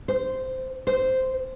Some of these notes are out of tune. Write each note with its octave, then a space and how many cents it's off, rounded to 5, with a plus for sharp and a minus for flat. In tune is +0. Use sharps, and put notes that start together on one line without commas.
C5 -10
C5 -10